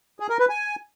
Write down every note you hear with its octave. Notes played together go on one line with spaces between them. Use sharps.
G#4
A#4
B4
G#5